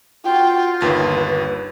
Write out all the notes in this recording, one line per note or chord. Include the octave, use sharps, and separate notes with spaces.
F4 F#4 G5
G1 D#2 B4 A6